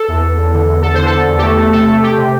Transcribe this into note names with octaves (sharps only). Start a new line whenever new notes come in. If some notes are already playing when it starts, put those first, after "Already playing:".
Already playing: A4
E2
E2
E2
D3
E2
E2 A4
D3 C5
A4
D3
E2
G4
A3 A4
A3
C3 A4
A3
A3 G4
C3